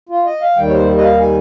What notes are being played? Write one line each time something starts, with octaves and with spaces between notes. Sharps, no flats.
F4
D#5
F5
D#2 D#3 G3 G5
C#5
C5
D#5
F5
G#5